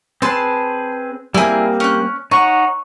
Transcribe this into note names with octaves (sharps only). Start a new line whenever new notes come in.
C4 G#4 B4 A5 C6
G3 A#3 C4 E4 G#4
C#4 F#6
D#4 C#5 F#5 C#6